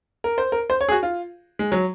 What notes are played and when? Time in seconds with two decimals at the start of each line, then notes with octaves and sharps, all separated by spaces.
0.24 A#4
0.38 C5
0.52 A#4
0.70 C5
0.81 C#5
0.89 G#4
0.92 F#4
1.03 F4
1.59 G#3
1.72 F#3